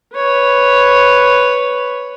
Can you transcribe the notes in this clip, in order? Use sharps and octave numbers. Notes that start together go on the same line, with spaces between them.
B4 C#5